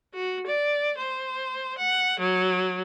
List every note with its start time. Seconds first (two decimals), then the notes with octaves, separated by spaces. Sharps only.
0.14 F#4
0.47 D5
0.98 C5
1.78 F#5
2.20 F#3